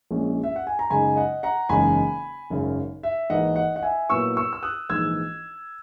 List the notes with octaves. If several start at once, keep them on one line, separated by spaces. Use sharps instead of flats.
A#1 A#2 G#3 C#4 E4
E5
F#5
G#5
A#5
F#2 C#3 G#3 D#4 G#5 B5
D#5 F#5
F#5 A#5
F#1 E2 C#3 G#3 D#4 G#5 B5
G#1 F#2 C#3
E5
G#1 G#2 E3 A#3 D#4 D#5 F#5
D#5 F#5
F#5
E5 G#5
A#2 F#3 B3 E4 C#6 E6
C#6 E6
E6
D#6 F#6
A#1 G#2 E3 E6 G#6